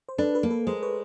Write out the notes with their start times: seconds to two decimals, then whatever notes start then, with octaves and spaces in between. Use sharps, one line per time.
0.09 C5
0.18 D4 A4 B4
0.35 A4 B4
0.43 A#3
0.51 A4 B4
0.67 G#3 A#4 C5
0.83 B4 C#5